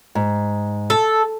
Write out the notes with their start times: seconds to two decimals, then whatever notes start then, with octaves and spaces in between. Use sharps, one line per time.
0.15 G#2
0.90 A4